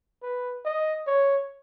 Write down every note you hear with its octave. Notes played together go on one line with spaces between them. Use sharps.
B4
D#5
C#5